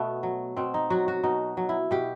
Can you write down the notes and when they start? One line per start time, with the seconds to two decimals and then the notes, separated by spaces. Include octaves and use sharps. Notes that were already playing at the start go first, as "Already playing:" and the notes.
Already playing: B2 A3 B3
0.23 F#3
0.57 B2 C4
0.74 D#4
0.90 F#3 F#4
1.08 F#4
1.23 B2 D#4
1.57 F#3
1.69 E4
1.91 B2 G4